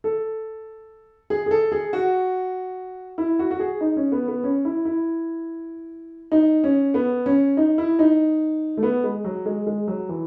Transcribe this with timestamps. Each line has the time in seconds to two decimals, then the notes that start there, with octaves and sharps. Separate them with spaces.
0.04 A4
1.30 G#4
1.46 G#4
1.51 A4
1.72 G#4
1.93 F#4
3.18 E4
3.39 F#4
3.51 F#4
3.60 G#4
3.81 D#4
3.97 C#4
4.12 B3
4.28 B3
4.44 C#4
4.65 E4
4.85 E4
6.32 D#4
6.64 C#4
6.94 B3
7.26 C#4
7.57 D#4
7.78 E4
7.99 D#4
8.77 A3
8.83 B3
9.04 G#3
9.24 F#3
9.46 G#3
9.67 G#3
9.88 F#3
10.09 E3